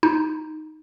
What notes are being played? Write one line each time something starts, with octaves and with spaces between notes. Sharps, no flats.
D#4